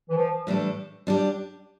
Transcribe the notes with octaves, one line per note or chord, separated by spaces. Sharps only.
E3
F3
A2 E3 G3 D4 A4
G3 D4 G4